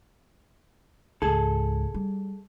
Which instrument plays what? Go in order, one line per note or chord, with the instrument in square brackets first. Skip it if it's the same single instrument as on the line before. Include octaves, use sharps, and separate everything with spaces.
[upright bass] C#2 G#2 [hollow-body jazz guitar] G#4 A4
[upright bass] G3